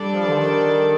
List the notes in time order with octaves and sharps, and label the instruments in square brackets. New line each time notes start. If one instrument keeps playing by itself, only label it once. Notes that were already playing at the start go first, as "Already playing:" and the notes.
Already playing: [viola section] G3 D4 A4 D5
[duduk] F3
D3
D#3